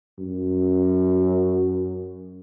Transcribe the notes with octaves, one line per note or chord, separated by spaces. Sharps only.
F#2